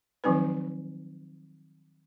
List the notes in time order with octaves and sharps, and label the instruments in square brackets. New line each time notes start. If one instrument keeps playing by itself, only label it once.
[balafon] D#3 F3 F#3 C4 D#4 B4